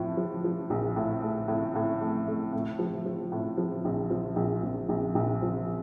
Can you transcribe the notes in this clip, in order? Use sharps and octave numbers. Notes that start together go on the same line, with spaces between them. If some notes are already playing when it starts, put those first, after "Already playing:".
Already playing: A2 F3
F3
F3
A#1
A2
A3
A2
A2
A3
A3
A2
F3
F3
A2
F3
A#1
F3
A#1
A#1
A#1
A#1
F3